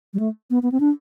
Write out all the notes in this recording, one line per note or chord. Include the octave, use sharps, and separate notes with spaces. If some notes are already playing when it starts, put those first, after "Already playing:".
G3
A3
B3
B3
C4
D4